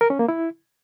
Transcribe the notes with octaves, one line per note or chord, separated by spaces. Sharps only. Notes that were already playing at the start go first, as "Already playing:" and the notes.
A#4
C#4
A#3
E4